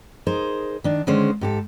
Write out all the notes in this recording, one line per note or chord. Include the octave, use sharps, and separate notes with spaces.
D#4 G#4 A#4 C5
D#3 D4
D3 D#3 G#3 C#4 C5
G#2 G4 A4